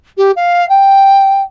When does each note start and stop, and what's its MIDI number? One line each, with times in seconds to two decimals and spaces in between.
0.17 0.31 67
0.36 0.68 77
0.69 1.41 79